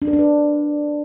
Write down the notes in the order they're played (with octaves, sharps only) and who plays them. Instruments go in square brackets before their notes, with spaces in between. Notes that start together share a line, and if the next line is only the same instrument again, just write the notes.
[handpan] D4
A#4
D4
B4